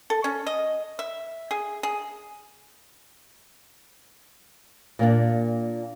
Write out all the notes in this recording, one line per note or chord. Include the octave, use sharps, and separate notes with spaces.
A4
C#4
D#5
E5
G#4
G#4
A#2 A#3 D4